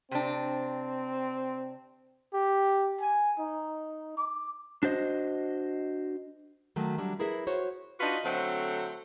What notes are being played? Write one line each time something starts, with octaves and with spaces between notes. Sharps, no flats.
C3 C4 D4
G4
G#5
D#4
D6
D4 F#4 C5 D#5
D#3 F#3 A3
F#3 G3 D4
E4 G#4 A#4 B4 E5
F#4 C5 C#5
D4 D#4 F4 F#4 B4 D#5
D3 F#3 A3 C4 A4 C5